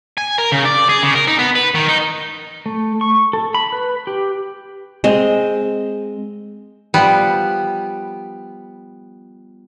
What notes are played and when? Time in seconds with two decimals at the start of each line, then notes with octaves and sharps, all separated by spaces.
0.18 G#5
0.38 A#4
0.52 C#3
0.65 D5
0.89 G#4
1.03 C#3
1.15 A#4
1.27 D#4
1.39 B3
1.55 B4
1.75 D#3
1.88 D#4
2.66 A3
3.01 C#6
3.33 A4
3.55 B5
3.72 B4
4.07 G4
5.04 G#3 C4 D#5
6.94 F3 G3 B3